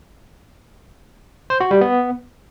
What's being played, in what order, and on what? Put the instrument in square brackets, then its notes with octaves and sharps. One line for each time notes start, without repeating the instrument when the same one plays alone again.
[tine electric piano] C5
F#4
G3
B3